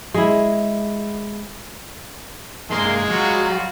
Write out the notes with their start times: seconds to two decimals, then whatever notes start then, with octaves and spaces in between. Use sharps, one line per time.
0.14 G#3 E4
2.70 G2 C3 G#3 A#3 C6
3.10 F#3 G3 F4 F#4